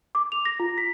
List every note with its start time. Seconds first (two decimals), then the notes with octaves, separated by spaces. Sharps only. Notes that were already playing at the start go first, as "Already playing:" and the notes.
0.15 D6
0.32 F7
0.45 A#6
0.60 F4
0.78 B6